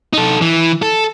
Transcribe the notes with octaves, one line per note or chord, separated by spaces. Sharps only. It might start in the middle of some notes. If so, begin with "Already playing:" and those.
D#4 A4
E3
A4